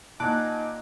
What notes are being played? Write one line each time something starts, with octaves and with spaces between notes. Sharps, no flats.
A#2 D#4 F#5 G#5 A5 D6 F#6 D7